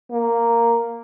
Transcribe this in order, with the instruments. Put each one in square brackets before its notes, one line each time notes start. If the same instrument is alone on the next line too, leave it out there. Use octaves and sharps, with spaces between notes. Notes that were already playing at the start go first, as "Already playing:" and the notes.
[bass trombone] A#3